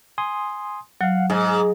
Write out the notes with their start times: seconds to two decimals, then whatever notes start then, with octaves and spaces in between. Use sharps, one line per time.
0.18 G#5 C6 D#6
1.01 F#3 F5 F#5
1.30 G#2 G#4 D#5